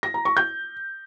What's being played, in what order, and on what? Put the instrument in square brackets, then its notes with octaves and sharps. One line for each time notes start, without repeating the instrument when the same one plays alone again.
[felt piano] A#6
A#5
C#6
G6